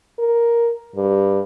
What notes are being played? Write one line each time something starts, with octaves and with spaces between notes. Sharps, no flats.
A#4
G2